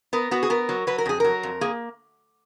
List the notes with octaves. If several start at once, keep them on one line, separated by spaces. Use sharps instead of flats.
B3 A#4
B3 F#4
G#4
B3 A#4
F#3
F#3 B4
A#4
F2 G#4
F#3 A#4
F2
A#3 G#4